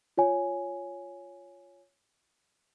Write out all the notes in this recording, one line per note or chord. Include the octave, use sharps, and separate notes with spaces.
F4 C#5 G#5